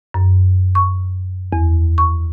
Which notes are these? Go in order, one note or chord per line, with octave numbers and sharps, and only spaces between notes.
F#2
C#6
E2
C#6